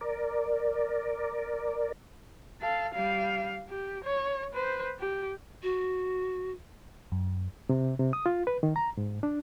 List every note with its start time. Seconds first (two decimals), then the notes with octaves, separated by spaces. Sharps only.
0.01 A#4 D5
2.61 A4 F5
2.94 G3 F5
3.69 G4
4.04 C#5
4.54 B4 C5
4.99 G4
5.63 F#4
7.12 F#2
7.69 C3
7.99 C3
8.13 D#6
8.26 F4
8.47 B4
8.63 D#3
8.76 A#5
8.97 G#2
9.23 D4